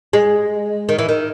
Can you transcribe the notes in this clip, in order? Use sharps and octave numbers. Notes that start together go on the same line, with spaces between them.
G#3
D#3
E3
D#3